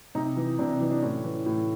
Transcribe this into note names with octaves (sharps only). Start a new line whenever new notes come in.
C3 D#4
E3
C3 D4
E3
D4
A2 C#4
E3
A2